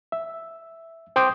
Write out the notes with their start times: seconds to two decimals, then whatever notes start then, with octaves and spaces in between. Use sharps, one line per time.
0.12 E5
1.16 C5 G5 C6 D6 D#6 G6